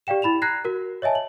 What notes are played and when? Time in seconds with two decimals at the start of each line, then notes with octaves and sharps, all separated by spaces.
0.07 G4 D5 F5 G5 E7
0.22 E4 B5 E7 F7
0.42 A#5 F#6 G#6 A#6 C7
0.65 F#4 A#4
1.02 C#5 D#5 E5 G#5 A5
1.15 F#7